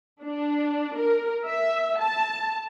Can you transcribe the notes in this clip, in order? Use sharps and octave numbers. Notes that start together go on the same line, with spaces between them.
D4
A#4
E5
A5